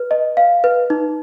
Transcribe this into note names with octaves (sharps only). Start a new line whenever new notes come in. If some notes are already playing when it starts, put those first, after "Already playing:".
Already playing: B4
D#5
F5
B4
D#4